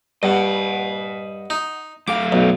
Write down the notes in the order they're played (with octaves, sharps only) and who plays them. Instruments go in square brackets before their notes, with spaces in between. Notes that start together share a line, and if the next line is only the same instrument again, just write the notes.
[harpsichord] G2 [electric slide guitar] D#5 F#5
[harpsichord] D#4
[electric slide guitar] F#2 A3 F5 [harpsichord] D6
[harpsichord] B1